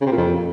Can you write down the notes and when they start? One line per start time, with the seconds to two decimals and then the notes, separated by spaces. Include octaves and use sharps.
0.01 C#3
0.06 C3
0.11 A#2
0.17 F2